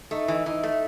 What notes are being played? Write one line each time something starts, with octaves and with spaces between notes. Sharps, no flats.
A3 D#4
E3 D#4
E3 D#4
A3